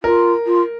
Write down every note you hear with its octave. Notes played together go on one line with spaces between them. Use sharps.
F4 A#4
F4